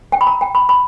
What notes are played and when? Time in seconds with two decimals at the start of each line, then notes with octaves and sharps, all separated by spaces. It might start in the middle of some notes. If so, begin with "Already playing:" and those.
0.12 G5
0.21 B5
0.27 A#5
0.41 G5
0.55 B5
0.69 B5